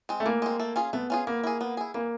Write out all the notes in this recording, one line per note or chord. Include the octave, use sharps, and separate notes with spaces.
G#3 C4
A3
E3 A#3
G#3 C4
A3
C#4 F4 G#4
A3 B3
C#4 F4 G#4
A#3 B3
E4 G#4
B3
E4 G#4
E3 A#3